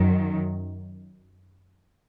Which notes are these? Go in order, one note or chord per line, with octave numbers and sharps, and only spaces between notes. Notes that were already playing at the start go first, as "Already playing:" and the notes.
Already playing: F#2 D#3 F#3